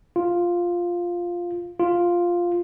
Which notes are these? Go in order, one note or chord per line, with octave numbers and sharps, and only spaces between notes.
F4
F4